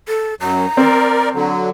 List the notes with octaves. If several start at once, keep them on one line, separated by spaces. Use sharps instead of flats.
A4
F#2 F#3 A#5
C4 A#4 D5
D3 F#3